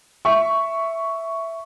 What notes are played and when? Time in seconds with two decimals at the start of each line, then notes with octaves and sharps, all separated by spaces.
0.25 E5 C#6